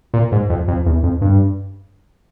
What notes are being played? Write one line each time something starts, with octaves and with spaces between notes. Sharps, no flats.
A#2
G#2
F2
F2
E2
F2
G2